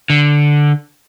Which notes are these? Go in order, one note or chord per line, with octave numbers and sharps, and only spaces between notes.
D3